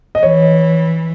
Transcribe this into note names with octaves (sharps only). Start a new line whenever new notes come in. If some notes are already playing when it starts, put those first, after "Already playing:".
D#5
E3 C#5